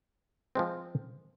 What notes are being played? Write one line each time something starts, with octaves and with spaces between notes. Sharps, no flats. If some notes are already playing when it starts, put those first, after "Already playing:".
F3 G#3 C4